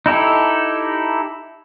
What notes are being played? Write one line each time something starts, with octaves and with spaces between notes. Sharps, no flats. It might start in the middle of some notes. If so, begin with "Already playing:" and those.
D#4 E4 G4 A4